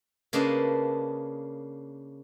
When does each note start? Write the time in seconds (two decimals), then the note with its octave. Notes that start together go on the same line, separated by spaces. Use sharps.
0.33 C#3 A#3 D4 B4 D#5 A5